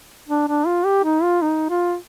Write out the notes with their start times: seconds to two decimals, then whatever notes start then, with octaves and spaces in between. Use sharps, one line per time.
0.28 D4
0.48 D4
0.66 F4
0.85 G4
1.04 D#4
1.22 F4
1.42 D#4
1.70 F4